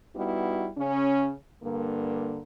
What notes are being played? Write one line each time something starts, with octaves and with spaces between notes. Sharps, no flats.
G3 B3 D#4 E4 F#4
C#3 C#4
G2 D3 A#3